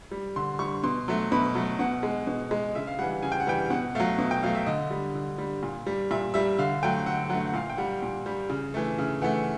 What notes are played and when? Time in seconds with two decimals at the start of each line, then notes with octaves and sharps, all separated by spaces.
0.11 G3
0.36 D3 C6
0.59 G3 C#6
0.84 B2 C6
1.08 F#3 A3
1.32 B2 B5
1.55 F#3 A3
1.79 B2 F#5
2.03 G#3
2.27 B2
2.51 G#3
2.75 C#3 E5
2.87 F5
2.99 E3 G3 F#5
3.22 C#3 G#5
3.32 G5
3.40 F#5
3.47 E3 G3 G5
3.70 B2 F#5
3.95 F#3 A3 F5
4.18 B2
4.31 G5
4.43 F#3 A3 F5
4.55 E5
4.66 D3 D#5
4.91 G3
5.15 D3
5.38 G3
5.63 A#2
5.87 G3
6.11 A#2 E5
6.34 G3 E5
6.58 D3 F5
6.83 F#3 A3 G5
7.06 D3 F#5
7.30 F#3 A3 F#5
7.47 F#5
7.54 A#2 F5
7.70 G5
7.77 G3 F#5
8.03 A#2
8.26 G3
8.50 C#3
8.74 E3 A3
8.98 C#3
9.22 E3 A3 F#5